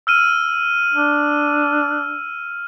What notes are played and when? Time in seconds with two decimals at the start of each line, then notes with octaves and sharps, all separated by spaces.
0.07 E6 F6 D#7
0.93 D4